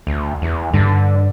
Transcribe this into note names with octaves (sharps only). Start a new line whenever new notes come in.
D2
E2
G2 D3